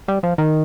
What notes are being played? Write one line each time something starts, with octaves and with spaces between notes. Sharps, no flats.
G3
F3
D#3